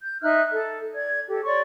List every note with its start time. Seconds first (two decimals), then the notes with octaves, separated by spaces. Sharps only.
0.04 G6
0.22 D#4 E5 F6 F#6
0.53 A4
0.94 D5 G#6
1.28 G4 A4
1.45 C#5 D5 C6 C#6